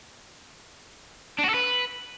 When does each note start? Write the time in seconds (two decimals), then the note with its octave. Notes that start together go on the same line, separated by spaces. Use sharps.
1.39 D4
1.44 F#4
1.49 A4
1.54 B4